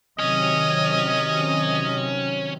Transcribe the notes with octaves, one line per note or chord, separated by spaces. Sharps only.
C3 D#3 F#3 C#4 D#5